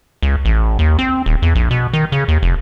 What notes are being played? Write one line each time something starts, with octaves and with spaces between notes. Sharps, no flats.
C#2
A1
D#2
C4
D#1
E2
A#1
B2
D#3
C#3
D#2
F1